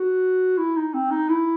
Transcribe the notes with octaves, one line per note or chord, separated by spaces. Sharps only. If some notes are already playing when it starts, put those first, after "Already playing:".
Already playing: F#4
E4
D#4
C4
D#4
E4